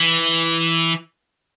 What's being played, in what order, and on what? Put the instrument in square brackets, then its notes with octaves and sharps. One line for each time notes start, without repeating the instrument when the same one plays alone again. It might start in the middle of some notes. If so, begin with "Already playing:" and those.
Already playing: [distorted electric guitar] E3